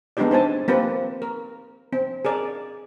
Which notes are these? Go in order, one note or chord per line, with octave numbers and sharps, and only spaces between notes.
G#3 B3 D4 D#4 G4 D5
C4 C5 G#5 A5
A#3 C4 G4 B4
A#4
C4
G#4 A#4 D5